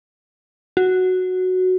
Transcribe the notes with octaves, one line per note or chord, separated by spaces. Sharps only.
F#4